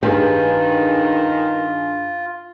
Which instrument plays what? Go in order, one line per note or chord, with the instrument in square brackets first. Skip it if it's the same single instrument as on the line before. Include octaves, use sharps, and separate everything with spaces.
[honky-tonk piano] G2 G#4 [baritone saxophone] D#3 [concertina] F4 [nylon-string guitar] G4 B4 G5